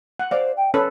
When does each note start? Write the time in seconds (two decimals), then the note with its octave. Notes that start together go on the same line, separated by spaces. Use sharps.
0.19 F#5
0.31 C5 D5 F5
0.57 G5
0.74 C#4 A4 B4 C#5